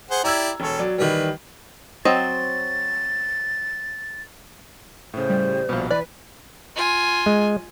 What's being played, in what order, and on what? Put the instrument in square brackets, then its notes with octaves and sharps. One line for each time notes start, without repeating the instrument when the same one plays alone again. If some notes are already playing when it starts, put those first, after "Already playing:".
[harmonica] G#4 C5 F#5
[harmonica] E4 G4 D5 [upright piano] A#5 E6 G#6
[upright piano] E1 C#5 [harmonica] A4
[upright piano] F#3 D5
[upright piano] D#3 E3 G3 [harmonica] B4
[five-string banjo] F#3 C4 D#5 [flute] A6
[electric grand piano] A2 C#3 [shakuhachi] C5
[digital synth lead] G3
[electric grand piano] A#1 B2 [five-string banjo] G3 F4
[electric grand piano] E3 [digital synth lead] B4 [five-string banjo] D5
[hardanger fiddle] F4 G#5
[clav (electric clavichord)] G#3